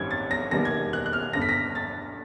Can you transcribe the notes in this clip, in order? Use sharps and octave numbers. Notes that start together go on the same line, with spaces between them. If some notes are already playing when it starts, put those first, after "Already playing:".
Already playing: A1 G2 D#3 G3 C4 G#6
A6
A#6
E1 D#2 D#3 G3 B3 A#6
G#6
F#6
F#6
F6
G1 G2 D3 A#6
B6
A#6
A6